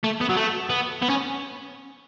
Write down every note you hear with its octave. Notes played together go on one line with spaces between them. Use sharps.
A3
B3
F#3
A3
B3
B3
C#4